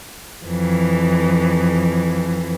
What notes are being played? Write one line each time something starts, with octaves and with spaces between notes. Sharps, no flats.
F2 E3